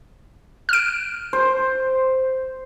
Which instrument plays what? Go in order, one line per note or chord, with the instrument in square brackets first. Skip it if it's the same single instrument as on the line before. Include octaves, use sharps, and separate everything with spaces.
[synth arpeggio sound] F6 D7
[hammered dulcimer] C5